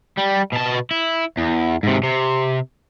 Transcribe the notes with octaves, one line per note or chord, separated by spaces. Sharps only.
G3
B2 A5
E4
E2
G#2 C3
C3